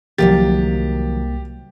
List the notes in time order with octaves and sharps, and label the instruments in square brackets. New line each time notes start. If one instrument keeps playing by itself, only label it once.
[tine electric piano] C2 A#3 A6 [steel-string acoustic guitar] D#3 F3 F#3 [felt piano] G4